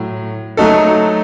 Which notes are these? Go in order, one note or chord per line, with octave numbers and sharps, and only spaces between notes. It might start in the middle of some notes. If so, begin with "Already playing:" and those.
Already playing: A2 F#3
F#3 A3 D#4 F#4 A4